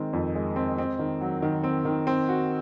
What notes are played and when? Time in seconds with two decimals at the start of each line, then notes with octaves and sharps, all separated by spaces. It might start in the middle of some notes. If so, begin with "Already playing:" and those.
Already playing: D#3 G#3 C4
0.13 F2
0.35 G#3
0.56 C4
0.78 C4
0.99 D#3
1.21 F#3
1.42 D#3
1.64 C4
1.85 D#3
2.07 C4
2.29 F#4